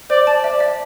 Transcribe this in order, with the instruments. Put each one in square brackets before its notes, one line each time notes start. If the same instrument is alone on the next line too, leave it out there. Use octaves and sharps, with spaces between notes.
[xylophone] C5 [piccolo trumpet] D5
[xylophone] A5
[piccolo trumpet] D5 [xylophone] E5
[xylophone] E5